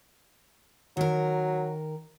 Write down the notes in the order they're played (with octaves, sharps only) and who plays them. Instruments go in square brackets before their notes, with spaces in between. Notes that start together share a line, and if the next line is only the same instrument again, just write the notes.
[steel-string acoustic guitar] D#3 A#4 [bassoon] F#3